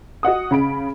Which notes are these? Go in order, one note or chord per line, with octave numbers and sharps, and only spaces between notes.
F#4 D#5 F#5 D#6
C#3 B5 D7